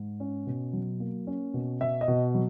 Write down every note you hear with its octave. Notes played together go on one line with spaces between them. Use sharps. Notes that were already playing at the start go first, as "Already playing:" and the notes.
Already playing: G#2
C#4
B2
F#3
A#3
C#4
B2
B2 E5
D#5
B2
F#3